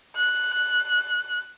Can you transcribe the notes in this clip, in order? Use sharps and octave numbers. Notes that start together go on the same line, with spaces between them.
F#6